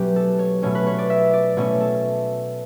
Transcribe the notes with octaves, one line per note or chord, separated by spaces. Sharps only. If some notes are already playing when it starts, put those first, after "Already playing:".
Already playing: B2 F#3 A3 C#4 G4 B4
A4
C#5
B2 A3 C#4 C#5
B4
C#5
D5
E5
D5
B2 A3 C#4 C#5
A4